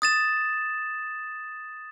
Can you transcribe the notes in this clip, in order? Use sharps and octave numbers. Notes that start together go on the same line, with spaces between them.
D#6 A6 E7